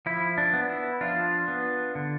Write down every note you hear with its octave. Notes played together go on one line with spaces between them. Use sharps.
F3 E4
D4
B3
E4
F3 D4 F4
B3
D3